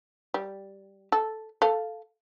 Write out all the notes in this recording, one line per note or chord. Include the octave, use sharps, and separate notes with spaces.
G3
A4
A4 F5